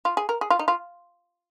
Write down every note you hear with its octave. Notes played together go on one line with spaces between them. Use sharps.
F4
G#4
A#4
G#4
F4
D#4
F4